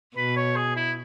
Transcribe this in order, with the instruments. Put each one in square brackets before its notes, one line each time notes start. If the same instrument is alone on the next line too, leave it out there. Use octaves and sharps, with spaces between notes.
[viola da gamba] B2 [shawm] B4
[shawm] C#5
G#4
E4